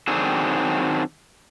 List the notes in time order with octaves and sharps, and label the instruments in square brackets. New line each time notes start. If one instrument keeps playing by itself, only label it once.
[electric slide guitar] D#3 F#3 C4 D4 G#4 A4